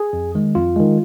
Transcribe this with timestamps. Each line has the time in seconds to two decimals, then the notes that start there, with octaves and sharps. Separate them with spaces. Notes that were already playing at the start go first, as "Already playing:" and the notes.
Already playing: G#4
0.13 F2
0.35 D#3 G#3
0.55 F2 F4
0.76 D#3 G#3